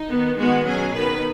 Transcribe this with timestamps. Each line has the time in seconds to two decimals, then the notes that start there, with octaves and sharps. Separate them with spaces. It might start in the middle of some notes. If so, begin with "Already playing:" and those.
Already playing: D#4
0.10 D#3 B3
0.38 D#3 G#3 B3 F#4
0.66 B2 F#3 C#4 G#4
0.94 D#3 B3 B4